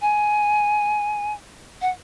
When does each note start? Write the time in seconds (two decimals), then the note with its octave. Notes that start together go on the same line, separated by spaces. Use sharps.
0.02 G#5
1.82 F#5